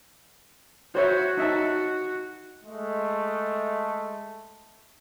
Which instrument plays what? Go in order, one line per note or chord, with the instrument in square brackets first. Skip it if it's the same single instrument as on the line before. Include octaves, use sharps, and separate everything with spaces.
[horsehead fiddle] F#4 [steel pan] C5 C#5 E5
[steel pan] D#4 E5 A5
[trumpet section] G#3 A3